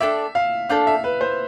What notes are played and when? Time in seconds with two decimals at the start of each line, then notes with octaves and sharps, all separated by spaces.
0.01 D4 A4 D5 E5 G5
0.35 F5
0.69 D4 A4 D5 F5 G5
0.87 E5
1.04 B4
1.21 C5